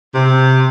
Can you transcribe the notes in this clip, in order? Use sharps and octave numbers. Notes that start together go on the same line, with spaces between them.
C3